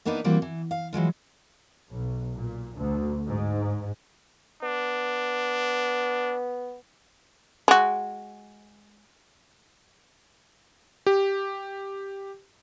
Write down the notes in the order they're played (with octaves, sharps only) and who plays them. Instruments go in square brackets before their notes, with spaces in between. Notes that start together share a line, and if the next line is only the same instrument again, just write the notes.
[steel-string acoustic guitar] E3 A#3 B3 D4 D#4 B4
E3 G3 A#3 C4 F#4 G4
E3
F5
E3 F#3 G#3 F4
[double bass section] B1
A#2
D2
G#2
[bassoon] B3 [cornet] D4
[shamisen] G#3 F#4
[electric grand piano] G4